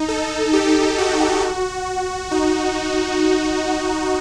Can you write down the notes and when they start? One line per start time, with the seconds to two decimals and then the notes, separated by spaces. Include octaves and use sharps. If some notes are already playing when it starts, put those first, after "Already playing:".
Already playing: D#4
0.08 A4
0.53 G4
0.98 F#4
2.31 D#4